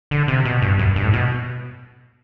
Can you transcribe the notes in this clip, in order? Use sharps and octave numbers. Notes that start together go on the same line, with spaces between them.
D3
C3
B2
G2
F#2
G2
A2
B2